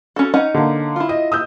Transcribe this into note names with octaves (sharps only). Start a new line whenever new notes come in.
C#4 F#4 A4
C#4 D#4 F#5
D3 A#3
E4 F4
D#5
D#6 E6 G6